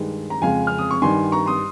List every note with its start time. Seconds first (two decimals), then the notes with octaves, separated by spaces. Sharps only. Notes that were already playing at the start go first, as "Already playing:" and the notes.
Already playing: G2 D#3 G#3
0.30 A#5
0.42 F2 C#3 G#3 F5 G#5
0.67 F6
0.78 D#6
0.91 C#6
1.02 G2 D#3 G3 G#5 C6
1.32 A#5 C#6
1.46 C6 D#6